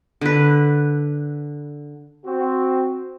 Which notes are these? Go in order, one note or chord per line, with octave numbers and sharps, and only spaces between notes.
D3 B4
C4 F#4